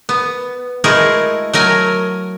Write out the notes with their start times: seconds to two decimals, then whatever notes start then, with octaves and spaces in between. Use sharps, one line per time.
0.09 B3
0.84 G#3 A3 E4 F#4 G#4 A#4
1.53 F#3 A3 A#4 G#5